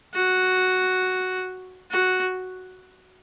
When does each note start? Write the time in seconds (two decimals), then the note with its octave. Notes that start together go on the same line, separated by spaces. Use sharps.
0.14 F#4
1.91 F#4